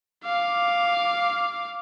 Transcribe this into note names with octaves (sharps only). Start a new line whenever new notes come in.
F5 D6